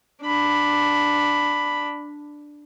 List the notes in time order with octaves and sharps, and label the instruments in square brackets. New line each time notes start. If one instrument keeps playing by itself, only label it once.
[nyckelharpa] D4 B5